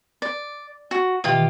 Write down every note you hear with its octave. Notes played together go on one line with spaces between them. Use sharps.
D5
F#4
B2 D#3 E3 F4 G4